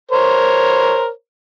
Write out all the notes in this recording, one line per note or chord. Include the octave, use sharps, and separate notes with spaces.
A#4 C5 C#5